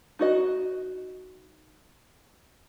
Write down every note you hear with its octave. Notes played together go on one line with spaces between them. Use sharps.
D#4 F#4 D#5